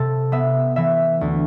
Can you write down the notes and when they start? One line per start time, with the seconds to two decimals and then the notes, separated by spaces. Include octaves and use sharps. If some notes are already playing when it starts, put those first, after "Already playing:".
Already playing: C3 A4
0.32 B3 E5
0.76 E3 E5
1.21 D2